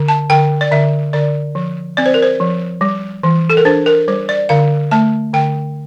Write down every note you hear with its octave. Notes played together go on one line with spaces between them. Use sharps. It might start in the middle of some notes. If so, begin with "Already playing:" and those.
Already playing: D3
A5
D3 G5
D5
D3 E5
D3 D5
F3
C4 D5
C5
A#4
C5
F3
G3
E3
A4
A#4
D4 C5
A#4
G3 C5
D5
D3 F5
A3 A5
D3 G5